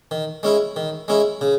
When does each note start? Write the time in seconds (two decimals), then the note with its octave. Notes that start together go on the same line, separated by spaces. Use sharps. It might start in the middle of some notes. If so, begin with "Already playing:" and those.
0.11 D#3
0.43 G#3 C#4 E4
0.76 D#3
1.08 G#3 C#4 E4
1.41 C#3